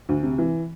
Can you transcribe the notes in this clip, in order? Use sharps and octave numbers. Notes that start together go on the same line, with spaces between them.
D2
C3
E3